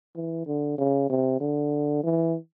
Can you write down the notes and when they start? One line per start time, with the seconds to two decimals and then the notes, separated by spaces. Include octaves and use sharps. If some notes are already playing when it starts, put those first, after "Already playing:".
0.16 E3
0.46 D3
0.78 C#3
1.09 C3
1.40 D3
2.04 E3